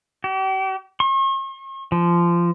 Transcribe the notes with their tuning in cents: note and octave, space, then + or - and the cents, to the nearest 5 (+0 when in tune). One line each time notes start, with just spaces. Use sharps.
G4 -40
C#6 -45
F3 -20